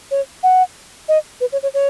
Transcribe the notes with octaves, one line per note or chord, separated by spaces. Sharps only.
C#5
F#5
D#5
B4
C#5
C#5
C#5